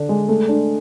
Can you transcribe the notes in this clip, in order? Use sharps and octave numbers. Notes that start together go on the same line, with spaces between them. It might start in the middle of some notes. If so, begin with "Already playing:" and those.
Already playing: D3 D4
G#3
A3
D4